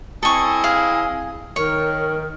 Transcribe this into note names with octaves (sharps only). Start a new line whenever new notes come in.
C4 E4 A4 D#5 G#5 C#6
G#4 F5
D#3 A#4 C#5